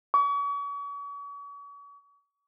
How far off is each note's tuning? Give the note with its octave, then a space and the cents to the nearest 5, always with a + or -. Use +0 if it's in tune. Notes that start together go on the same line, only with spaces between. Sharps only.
C#6 +40